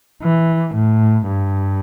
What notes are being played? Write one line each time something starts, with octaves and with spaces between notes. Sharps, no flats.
E3
A2
G2